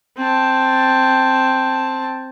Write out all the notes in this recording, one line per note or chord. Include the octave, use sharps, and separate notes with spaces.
C4 A5